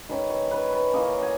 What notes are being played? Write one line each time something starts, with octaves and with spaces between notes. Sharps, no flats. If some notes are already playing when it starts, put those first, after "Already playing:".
D#3 G#3 C#4 B4
C#5
B4
B4
E3 A#3 C#4 D#5
G#5